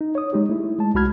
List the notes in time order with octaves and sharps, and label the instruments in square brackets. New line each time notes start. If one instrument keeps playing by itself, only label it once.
[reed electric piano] D#4
C#5 D#6
G#3 D#4 G4
A3 E4
G#3 A5
C2 G#3 F#4 B5 F6 G#6